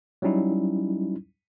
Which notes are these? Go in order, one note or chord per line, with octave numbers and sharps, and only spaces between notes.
F#3 G3 C#4 D#4 E4